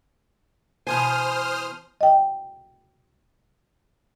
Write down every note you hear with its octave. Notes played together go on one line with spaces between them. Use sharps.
B2 E3 C5 G#5 D#6 F6
D#5 G5